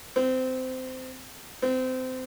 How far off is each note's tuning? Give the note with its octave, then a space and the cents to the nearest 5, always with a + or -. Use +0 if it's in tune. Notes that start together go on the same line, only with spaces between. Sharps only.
C4 -20
C4 -25